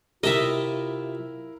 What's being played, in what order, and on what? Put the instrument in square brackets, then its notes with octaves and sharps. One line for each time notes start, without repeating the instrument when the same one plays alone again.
[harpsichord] C3 G4 A5 [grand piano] E4 A#4 [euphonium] F4 [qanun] D#5 E5